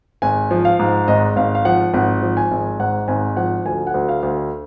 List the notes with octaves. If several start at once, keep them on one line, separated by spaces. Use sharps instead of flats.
G#1 G#5
F3
F5
G#2
G#1 D#5
G#1 F5
F5
F3 F#5
G#1 F#5
F3
G#5
G#1
G#2 F#5
G#1 G#5
F3 F#5
D2 G#5
F#5
D2
F5
D2